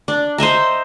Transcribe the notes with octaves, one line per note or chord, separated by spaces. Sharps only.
D4
C5 D#5 E5 A#5